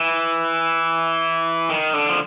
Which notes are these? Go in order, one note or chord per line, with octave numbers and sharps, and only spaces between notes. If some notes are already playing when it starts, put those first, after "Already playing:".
Already playing: E3
D#3
D3
F3